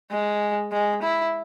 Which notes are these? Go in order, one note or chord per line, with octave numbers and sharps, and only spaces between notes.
G#3
G#3
E4